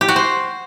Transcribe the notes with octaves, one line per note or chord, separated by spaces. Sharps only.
G4
F#4
C5